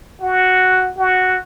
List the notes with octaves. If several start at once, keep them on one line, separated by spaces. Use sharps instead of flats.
F#4
F#4